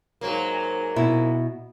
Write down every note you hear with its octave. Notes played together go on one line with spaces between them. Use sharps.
G#2 F#3 A#3
B2 E4